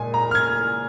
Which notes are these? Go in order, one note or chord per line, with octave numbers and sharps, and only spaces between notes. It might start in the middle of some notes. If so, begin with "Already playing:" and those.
Already playing: A#2 G#3 G#5
A#5
F6
G#6